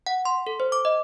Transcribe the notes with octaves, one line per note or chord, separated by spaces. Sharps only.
F#5
C6
A4
C5
D6
D#5